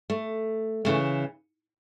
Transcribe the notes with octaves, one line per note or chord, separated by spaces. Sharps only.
A3
C#3 E3 A3